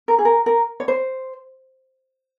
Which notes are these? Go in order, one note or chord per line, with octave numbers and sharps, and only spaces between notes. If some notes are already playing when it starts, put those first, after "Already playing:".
A#4
G#4
A#4
A#4
C#5
C5